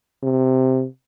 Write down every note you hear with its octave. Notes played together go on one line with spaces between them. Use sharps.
C3